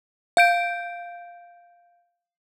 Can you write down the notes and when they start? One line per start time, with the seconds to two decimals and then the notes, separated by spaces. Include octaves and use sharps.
0.37 F5 G6 D7